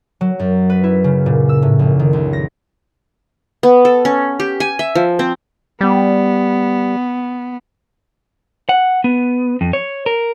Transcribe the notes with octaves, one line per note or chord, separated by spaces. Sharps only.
F#3
F#2
B4
E4
C#3
A#2
E6
A2
A#1
D#3
C#2
A#6
B3
A4
C#4
G4
G#5
E5
F3
C4
G3 B3
F#5
B3
F2
C#5
A#4